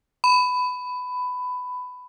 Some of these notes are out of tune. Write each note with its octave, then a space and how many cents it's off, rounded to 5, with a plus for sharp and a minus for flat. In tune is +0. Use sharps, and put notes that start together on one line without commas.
B5 +15